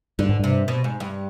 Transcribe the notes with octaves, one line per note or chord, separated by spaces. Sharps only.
G2 D3
G#2
G2 C3
B2
G#2
G2